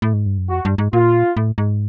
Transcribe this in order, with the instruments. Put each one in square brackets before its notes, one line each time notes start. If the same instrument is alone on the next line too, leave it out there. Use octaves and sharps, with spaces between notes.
[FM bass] A2
G#2
G2
F#2
[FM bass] F2 [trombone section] F#4
[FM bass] G2
G#2
[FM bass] A#2 [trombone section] F4
[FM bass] A2
G#2